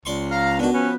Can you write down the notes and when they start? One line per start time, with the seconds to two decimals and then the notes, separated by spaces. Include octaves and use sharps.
0.05 C#2 D5 C6 C#6
0.31 F5 A#5 F6
0.59 B2 D#3 B3 D4 F#4
0.74 F3 C#4 B4